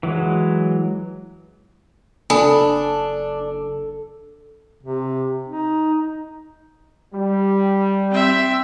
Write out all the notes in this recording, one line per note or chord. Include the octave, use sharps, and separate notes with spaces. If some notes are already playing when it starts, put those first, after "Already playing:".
E3 F#3 G#3
F#1 D4 A4 G#5 B5 D#6
C3
D#4
G3
C4 E5